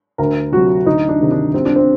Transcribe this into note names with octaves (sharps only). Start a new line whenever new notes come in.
D2 A#4
C3 F#3 F#4
D2 D#4
D4
C3 D#3
D4
C2 C4
D4
C4